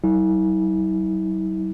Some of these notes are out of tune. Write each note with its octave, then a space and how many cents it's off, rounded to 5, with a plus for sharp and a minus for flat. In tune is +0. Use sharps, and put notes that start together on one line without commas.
F#3 +45 E4 -45